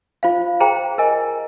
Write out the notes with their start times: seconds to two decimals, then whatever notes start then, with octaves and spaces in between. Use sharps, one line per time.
0.23 F4 C5 F5
0.60 G#4 C5 G5 A#5
0.98 A#4 D#5 G#5